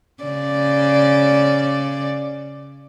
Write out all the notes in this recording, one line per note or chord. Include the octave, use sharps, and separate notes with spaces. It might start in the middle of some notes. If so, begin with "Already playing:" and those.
C#3 D5